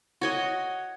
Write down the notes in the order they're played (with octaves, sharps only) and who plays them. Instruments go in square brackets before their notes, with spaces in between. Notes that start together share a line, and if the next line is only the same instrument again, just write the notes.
[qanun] F#4 C#5 D#5